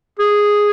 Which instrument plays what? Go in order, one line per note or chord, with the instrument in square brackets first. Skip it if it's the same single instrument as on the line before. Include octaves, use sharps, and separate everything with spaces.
[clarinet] G#4